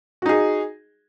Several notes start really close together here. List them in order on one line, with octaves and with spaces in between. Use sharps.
F#4 D#4 G#4